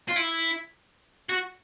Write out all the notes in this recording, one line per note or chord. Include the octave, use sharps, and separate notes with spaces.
F4
E4
F#4